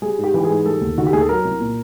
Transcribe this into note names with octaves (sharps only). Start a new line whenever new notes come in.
G3 G#4
G#2
G4
E3 G4
G#4
G#2
G3 A4
D#2
D#3 F#4
G4
D#2 G#4
A4
F#3 A#4
C2
A#2